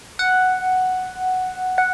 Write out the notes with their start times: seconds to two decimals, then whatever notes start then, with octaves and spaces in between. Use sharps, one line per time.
0.19 F#5
1.78 F#5